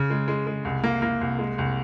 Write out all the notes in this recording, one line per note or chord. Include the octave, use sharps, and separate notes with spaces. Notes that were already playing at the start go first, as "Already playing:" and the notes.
Already playing: C#3
G#3
G#3
G#3
C2
A#3
A#3
C2
G#3
C2